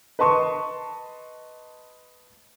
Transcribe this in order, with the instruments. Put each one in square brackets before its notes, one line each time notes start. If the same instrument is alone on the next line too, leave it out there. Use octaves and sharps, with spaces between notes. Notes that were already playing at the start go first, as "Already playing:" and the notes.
[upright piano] B4 D#5 A5 C6 C#6